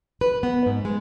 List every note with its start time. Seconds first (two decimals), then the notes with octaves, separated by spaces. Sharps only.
0.21 B4
0.43 B3
0.66 G#2
0.85 G#3